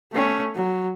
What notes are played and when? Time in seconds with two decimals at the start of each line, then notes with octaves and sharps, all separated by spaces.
0.12 A3 C#4
0.55 F#3